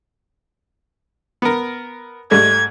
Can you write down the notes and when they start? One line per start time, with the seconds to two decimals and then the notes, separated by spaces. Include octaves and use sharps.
1.42 B3 A#4
2.31 G#2 G3 A3 G#6